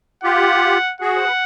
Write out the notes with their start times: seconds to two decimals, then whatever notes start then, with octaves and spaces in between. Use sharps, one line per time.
0.24 F4 G4 F#5
1.01 F#4 G#4 F#5
1.17 C5
1.25 B4